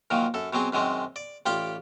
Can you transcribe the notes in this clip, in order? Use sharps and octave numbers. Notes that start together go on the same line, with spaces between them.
A#2 D#3 F3 F#3
F#2 A4
B2 F#3 C4 G#4
F#2 D#3 F#3 G#3 C4
D5
A1 F4 G4 D5 G5 D6